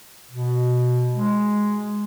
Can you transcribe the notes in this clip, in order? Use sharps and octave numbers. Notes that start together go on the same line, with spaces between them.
B2
G#3